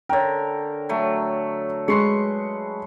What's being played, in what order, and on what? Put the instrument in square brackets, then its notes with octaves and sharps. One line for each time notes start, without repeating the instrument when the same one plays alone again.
[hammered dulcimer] D3 A#4 [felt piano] C#5 G5
[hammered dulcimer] F#3 A3
[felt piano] G#3 [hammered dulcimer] B4 C6 C#6